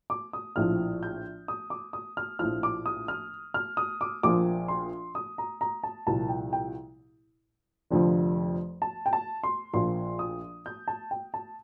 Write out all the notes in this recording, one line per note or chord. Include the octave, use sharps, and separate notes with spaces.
D6
D#6
A#1 A2 F3 F6
G6
D#6
D6
D#6
F6
A#1 A2 F3 F6
D6
D#6
F6
F6
D#6
D6
A#1 A#2 F3 D6
C6
D#6
A#5
A#5
A5
C2 A#2 F3 A5
G5
G5
F1 F2 D3 F3
A5
G5
A5
C6
A#1 A#2 F3 C6
D#6
G6
A5
G5
A5